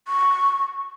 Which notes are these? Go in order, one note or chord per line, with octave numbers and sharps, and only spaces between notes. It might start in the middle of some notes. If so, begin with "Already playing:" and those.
C#6